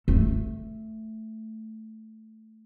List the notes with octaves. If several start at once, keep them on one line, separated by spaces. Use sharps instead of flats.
A3